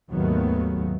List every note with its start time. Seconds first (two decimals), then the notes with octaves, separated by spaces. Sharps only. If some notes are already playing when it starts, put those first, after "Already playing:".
0.11 D#2 G#2 D#3 F#3 A3 B3